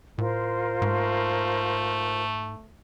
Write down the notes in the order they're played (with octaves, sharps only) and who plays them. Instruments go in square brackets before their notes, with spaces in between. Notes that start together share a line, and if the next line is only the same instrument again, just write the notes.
[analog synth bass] A2 [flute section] F4 A#4 C5
[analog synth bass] G#2 [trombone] A3